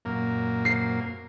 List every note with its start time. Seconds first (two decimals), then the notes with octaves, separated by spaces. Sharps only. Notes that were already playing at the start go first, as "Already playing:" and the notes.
0.05 F#2 A#2 A#3
0.65 C7